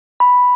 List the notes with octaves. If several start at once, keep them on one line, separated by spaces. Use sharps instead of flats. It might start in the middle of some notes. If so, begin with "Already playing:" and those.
B5